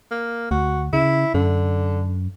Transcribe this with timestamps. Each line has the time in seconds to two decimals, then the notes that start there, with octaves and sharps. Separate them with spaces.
0.11 A#3
0.51 D2 F#4
0.93 C#3 E4
1.34 F#2 D3